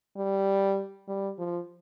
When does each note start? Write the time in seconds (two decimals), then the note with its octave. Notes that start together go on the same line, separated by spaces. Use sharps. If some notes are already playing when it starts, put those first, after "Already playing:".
0.17 G3
1.08 G3
1.39 F3